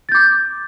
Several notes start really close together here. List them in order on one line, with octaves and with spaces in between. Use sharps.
A6 G6 D6